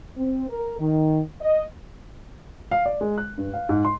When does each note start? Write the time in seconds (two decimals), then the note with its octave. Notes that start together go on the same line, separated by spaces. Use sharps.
0.16 C4
0.49 A#4
0.80 D#3
1.40 D#5
2.71 F5
2.86 D5
3.01 G#3
3.18 F#6
3.38 G2
3.54 F5
3.69 G#2
3.85 C6